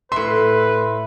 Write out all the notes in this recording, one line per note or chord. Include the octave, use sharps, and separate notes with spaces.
A2 B4 E5 C6